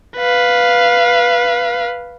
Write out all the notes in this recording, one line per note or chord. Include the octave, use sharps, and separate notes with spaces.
B4 F5